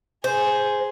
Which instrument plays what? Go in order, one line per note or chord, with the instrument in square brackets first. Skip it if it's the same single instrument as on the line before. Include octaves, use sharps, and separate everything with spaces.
[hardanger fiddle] G#4 [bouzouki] C5